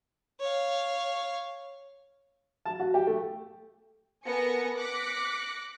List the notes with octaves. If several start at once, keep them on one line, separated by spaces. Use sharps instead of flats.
C#5 F5
A5
F#4
G4
A3
B3 A4 A#4 G#5 A#6 C#7
D6 F#6 A#6 B6 C#7